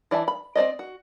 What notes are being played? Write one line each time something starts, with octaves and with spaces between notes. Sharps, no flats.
E3 D5 E5 A5
B5
C4 C5 D5 D#5
F#4